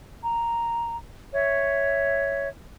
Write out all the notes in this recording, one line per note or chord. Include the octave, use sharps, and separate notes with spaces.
A#5
C#5 E5